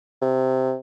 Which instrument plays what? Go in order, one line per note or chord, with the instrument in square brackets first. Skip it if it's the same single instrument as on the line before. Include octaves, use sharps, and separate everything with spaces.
[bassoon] C3